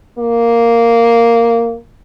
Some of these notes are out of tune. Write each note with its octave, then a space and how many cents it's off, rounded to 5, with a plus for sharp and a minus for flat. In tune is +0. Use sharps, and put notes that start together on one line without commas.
A#3 -5